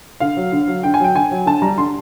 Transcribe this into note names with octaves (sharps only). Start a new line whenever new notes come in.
D3 F5
F#3
D3
F#3
D3 G5
G#5
F#3 G5
D3 G#5
F#3
D3 A5
G3 A#5
D3 C6